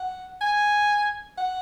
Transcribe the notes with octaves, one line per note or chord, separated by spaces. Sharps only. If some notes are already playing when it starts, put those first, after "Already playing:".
Already playing: F#5
G#5
F#5